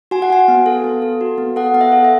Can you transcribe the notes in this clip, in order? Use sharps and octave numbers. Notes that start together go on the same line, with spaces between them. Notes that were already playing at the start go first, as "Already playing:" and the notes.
F#4 G#5
F#5
F#4 G#5
B3
A4
B3
A4
F#4
B3
A4 F#5
B3 F#5
E5
A4
E5